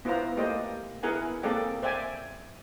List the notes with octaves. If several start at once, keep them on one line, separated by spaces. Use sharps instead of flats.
B3 E4 F4 B4 C5 A#5
A3 A#3 G4 C5 D5 D#5
B3 E4 G#4 A#4 F#5 G#5
A#3 C4 G#4 A4 D5 G5
C5 D5 E5 G5 G#5